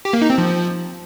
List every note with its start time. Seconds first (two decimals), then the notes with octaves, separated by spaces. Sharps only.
0.05 G4
0.13 A#3
0.22 D#4
0.30 C4
0.38 F3